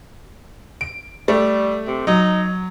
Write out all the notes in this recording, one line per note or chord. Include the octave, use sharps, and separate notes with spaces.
D7
G3 A3
C3
F#3 D#4